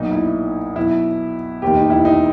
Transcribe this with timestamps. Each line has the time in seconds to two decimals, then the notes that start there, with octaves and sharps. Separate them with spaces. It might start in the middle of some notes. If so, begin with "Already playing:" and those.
Already playing: B1 A#2 D#4
0.12 E4
0.76 B1 B2 E4
1.62 E1 D#2 D#3 G4
1.77 D#4
1.90 E4
2.05 D#4